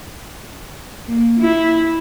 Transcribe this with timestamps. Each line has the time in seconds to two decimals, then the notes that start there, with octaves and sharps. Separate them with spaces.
1.07 A#3
1.40 E4